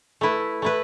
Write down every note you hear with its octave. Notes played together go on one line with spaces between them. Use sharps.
A3 E4 B4
A3 E4 B4